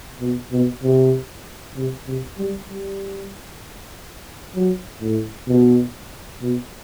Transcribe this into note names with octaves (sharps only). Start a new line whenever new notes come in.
B2
B2
C3
C3
C3
G3
G3
F#3
A2
B2
B2